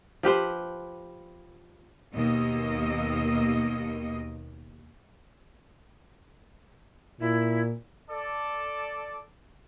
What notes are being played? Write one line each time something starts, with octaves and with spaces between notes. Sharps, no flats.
F3 G4 B4 C5
D#2 B2 A#3 D#5
A#2 E4
A4 D5